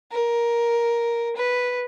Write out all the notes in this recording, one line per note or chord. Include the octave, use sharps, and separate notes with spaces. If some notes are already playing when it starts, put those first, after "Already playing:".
A#4
B4